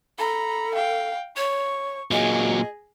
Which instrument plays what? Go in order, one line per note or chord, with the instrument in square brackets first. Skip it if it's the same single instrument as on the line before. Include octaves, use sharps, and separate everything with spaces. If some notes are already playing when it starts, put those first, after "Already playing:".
[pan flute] A4 [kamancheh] A#5 B5
[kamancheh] F5 G5
[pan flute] C#5 [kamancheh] C#6
[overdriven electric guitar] A#2 F#3 [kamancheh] G#4 [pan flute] D#5